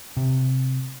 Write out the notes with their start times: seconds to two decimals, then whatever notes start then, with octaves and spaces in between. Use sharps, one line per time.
0.17 C3